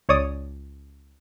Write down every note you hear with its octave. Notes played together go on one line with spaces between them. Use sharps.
C#2 C#5 D5 D#6